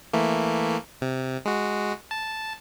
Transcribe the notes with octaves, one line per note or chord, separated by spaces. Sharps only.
E3 A3 A#3
C3
G#3 F#4
A5